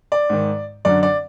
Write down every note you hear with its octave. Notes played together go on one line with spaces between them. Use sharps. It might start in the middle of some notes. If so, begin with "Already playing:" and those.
D5
G#2 D#3
F#2 D3 D5
D5